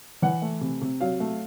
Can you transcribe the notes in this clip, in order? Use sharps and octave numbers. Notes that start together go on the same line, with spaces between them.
E3 F#5
A3
C3
C3
F#3 F5
A3